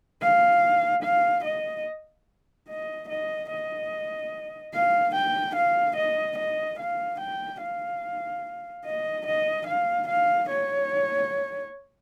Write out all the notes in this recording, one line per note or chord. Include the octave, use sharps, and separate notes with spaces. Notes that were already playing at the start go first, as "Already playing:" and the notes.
F5
F5
D#5
D#5
D#5
D#5
F5
G5
F5
D#5
D#5
F5
G5
F5
D#5
D#5
F5
F5
C#5